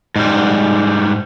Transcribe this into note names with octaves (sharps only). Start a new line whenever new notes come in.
G#2 G3